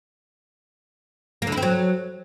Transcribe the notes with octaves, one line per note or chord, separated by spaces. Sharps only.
A#3
D3
E4
C4
F#3